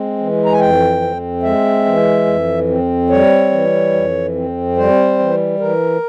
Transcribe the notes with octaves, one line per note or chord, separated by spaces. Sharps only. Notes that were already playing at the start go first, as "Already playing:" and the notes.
Already playing: G#3 C4
E3
A#5
G#5
F2 G5
C4
G#3 E5
E3
F2
C4
G3 C#5
E3
F2
C4
G3 C5
E3
E3 A#4